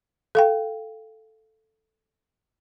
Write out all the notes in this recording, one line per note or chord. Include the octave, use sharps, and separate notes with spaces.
A4 F5 G5